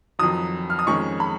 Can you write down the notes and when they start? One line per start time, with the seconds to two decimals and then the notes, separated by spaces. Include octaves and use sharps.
0.19 F2 D#3 F#3 D#6
0.70 F6
0.79 D#6
0.86 F2 D#3 G#3 C#4 C#6
1.20 B5